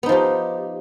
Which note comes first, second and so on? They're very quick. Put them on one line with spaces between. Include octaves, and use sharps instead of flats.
B3 D#4 F3 G4